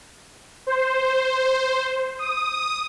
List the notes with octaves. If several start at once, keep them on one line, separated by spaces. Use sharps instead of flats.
C5
D#6